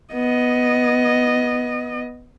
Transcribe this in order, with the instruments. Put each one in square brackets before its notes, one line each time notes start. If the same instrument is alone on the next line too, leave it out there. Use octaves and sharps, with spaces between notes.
[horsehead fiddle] B3 D#5